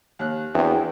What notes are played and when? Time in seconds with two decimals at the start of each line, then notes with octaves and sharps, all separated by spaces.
0.19 D#2 F#6
0.54 E2 C4 D4 F#4 G5